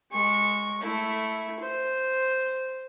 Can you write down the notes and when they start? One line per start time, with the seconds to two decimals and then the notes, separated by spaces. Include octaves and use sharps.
0.12 G#3 C#6
0.82 A3 E4
1.60 C5